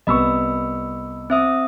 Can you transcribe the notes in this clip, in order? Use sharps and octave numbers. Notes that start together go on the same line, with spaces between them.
C2 B3 D#5 B5 C#6 E6
C4 E5 D#6